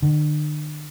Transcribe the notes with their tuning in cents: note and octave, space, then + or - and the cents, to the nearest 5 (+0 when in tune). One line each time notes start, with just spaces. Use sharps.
D3 +45